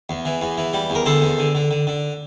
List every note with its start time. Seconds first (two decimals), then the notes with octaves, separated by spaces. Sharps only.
0.09 E2
0.25 E3
0.41 E2
0.58 E3
0.73 G3
0.90 E2
0.95 A#4
1.06 D3 A4 C5
1.22 E2
1.39 D3
1.55 D3
1.71 D3
1.87 D3